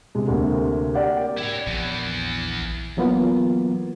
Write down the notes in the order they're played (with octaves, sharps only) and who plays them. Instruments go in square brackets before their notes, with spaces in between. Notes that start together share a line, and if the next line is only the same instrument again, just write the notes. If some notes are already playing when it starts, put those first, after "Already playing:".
[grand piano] C3 G#3
D2 C3 A#3
G4 A#4 D5 F#5 G5
[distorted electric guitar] E4 C#5
[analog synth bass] A#1 [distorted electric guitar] E2 E3
[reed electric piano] E3 F#3 A#3 B3 F4